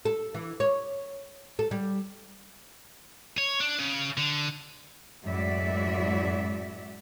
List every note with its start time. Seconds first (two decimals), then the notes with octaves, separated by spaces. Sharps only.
0.05 A4
0.34 E3
0.60 C#5
1.59 A4
1.71 G3
3.38 C#5
3.61 D4
3.79 C#3
4.18 D3
5.24 F#2 A2 G#3 F#4 D5 E5